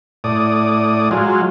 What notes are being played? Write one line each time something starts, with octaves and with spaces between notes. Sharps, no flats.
A2 D5 D#6
F#3 G#3 F4